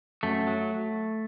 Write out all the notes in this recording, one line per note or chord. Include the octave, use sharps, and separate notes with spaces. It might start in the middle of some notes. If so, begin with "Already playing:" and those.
F#2 A3
F#3